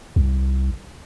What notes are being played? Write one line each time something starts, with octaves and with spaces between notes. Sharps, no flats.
C2